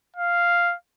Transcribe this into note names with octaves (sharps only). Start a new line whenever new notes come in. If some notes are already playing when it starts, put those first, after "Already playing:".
F5